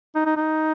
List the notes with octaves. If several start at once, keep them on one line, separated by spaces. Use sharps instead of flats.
D#4
D#4
D#4